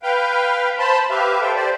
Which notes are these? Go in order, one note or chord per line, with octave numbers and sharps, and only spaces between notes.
B4 F5 G5
C5 A5 B5 C6
G4 B4 E5 F5
A4 C5 G5
G4 C5 D5